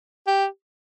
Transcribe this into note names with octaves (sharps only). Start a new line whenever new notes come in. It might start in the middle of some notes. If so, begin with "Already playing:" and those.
G4